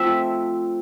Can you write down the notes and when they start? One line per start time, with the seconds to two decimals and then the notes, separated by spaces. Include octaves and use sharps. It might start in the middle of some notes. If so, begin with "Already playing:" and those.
Already playing: F3 A3 C4 E5